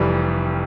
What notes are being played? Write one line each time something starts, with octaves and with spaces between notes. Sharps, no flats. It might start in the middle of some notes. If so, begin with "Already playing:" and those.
Already playing: F1 F2 E3 G3